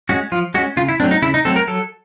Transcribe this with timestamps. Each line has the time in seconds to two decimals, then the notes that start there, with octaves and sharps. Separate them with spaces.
0.09 G#3 C#4 F#4
0.32 F3 F4
0.54 G#3 F#4
0.57 C#4
0.77 C#3 F4
0.89 E4
1.00 F#3 A3 C4 D4
1.11 D#4
1.22 C#3 E4
1.34 D#4
1.45 F#3 A3 C4 A4
1.56 A#4
1.67 F#3 A4